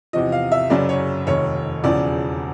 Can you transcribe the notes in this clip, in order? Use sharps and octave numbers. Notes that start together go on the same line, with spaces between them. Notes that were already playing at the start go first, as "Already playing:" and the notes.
E2 C3 F3 D#5
F5
E5
F#1 F#2 C#3 F#3 D5
C#5
F1 D#2 D#3 C#5
E1 E2 C#3 F3 D5